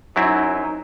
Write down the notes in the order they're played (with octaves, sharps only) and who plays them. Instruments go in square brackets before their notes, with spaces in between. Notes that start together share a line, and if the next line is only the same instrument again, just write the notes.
[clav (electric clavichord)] F#2 F#3 C4 E4 [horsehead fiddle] D#4